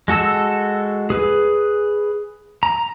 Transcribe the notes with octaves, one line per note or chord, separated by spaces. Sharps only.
G#3 F#4 A4 E6
G#4 B4
A#5